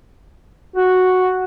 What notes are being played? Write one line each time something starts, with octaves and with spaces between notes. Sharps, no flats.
F#4